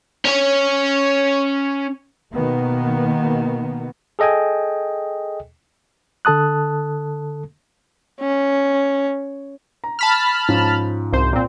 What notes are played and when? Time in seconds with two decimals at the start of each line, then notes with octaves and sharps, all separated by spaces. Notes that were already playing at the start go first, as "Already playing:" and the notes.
0.25 C#4 C#5
2.33 B2 D#3 A#3 B3
4.19 G#4 A4 D#5 G5 G#5
6.25 D3 A4 A5 D#6 F#6
8.21 C#4
9.84 A#5
9.99 A5 B5 F6
10.48 G#2 F3 C#4
11.13 C2 C5
11.33 A#2 C4